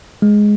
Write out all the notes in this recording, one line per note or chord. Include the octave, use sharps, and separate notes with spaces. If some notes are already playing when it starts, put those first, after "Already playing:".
G#3